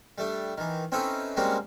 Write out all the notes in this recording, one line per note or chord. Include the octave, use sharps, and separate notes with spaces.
G3 A3 D4
D#3 E3
C4 C#4 D#4 E4 A4 B4
G3 G#3 A#3 C4 C#4 F#4